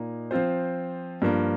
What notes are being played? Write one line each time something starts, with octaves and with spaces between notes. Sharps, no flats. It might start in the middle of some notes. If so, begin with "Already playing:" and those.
Already playing: A#2 A#3 D#4
F3 C4 F4 C5
G2 F3 A#3